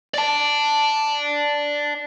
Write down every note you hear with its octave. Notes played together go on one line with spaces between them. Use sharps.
D5 A5